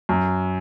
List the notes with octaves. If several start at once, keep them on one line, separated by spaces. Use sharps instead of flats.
F#2